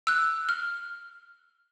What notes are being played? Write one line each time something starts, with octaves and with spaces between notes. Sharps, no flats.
E6 F#6
F6